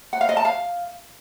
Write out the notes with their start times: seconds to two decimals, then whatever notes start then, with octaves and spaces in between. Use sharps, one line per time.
0.13 F#5
0.21 F5
0.29 D#5
0.37 A5
0.45 F5